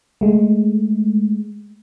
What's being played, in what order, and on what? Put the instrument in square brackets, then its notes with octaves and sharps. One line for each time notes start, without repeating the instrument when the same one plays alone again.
[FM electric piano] G#3 A3